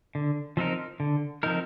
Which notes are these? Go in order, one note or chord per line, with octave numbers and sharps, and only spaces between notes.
D3
F3 C4 D#4 A#4
D3
F3 C4 D#4 A#4